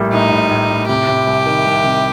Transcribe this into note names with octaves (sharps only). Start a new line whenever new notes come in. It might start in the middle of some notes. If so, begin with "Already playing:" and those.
Already playing: A#1 A2 G3 A#3
A2 D#4
A2
A2
A2
C3 G4
C3
C2
D#3
C2
C3